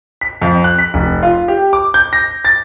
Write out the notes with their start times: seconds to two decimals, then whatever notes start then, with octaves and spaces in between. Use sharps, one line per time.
0.21 B6
0.41 F2
0.64 F#6
0.79 B6
0.94 F1
1.23 F4
1.48 G4
1.73 D6
1.94 G6
2.13 A#6
2.45 A6